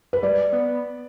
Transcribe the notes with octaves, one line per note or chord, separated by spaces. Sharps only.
B4
G3 D5
B3